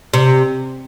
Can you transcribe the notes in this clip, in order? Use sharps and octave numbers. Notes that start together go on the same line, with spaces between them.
C3